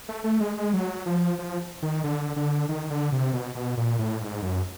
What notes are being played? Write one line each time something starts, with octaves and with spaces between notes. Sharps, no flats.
A3
A3
G#3
G#3
F#3
F3
F3
D#3
D3
D3
D#3
D3
C3
B2
B2
A#2
A2
G#2
F#2